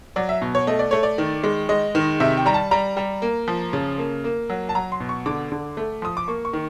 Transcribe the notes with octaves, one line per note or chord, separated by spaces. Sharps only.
F#3 D5
E5
B2
C#5
A3 D#5
D5
A3 C#5
D5
D#3
G#3
G#3 D#5
D#3
C3 E5
G5
G3 A#5
A5
G3 A#5
G3
A#3
F3
C#3
A#3
A#3
F#3
A5
F#3 A#5
C6
B2
C#6
D3 D6
D3
A3
F3 D#6
D6
A#3 C#6
C#6
D#3